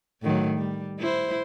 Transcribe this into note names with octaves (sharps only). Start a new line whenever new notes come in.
A2 D#3 F#3
G3
E4 C5